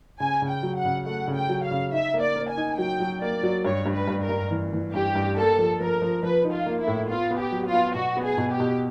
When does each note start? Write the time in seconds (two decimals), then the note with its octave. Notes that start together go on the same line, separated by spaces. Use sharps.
0.20 C#3 G#5
0.42 C#3
0.49 G5
0.63 F#3
0.77 F#5
0.85 C#3
1.06 A3 F#5
1.28 C#3
1.35 G5
1.49 F#3
1.64 F5
1.71 C#3
1.92 D#4 E5
2.14 A#3
2.21 D5
2.36 A#3
2.50 G#5
2.57 D#4
2.78 F#3 G5
3.00 F#3
3.21 A#3 D5
3.43 F#3
3.65 G2 C#5
3.86 G2
3.93 B4
4.08 G2
4.22 A#4
4.29 G2
4.51 E3
4.73 E3
4.94 G2 G4
5.15 G2
5.37 A#3 A4
5.58 F3
5.80 F3 A#4
6.02 F3
6.23 F3 B4
6.44 D#4
6.52 F4
6.66 A#3
6.81 E4
6.87 A2
7.09 B3 F4
7.31 B3
7.38 G4
7.52 F#3
7.67 F4
7.74 B3
7.95 B2 F#4
8.17 B3
8.24 G#4
8.38 B2
8.52 G4
8.60 B2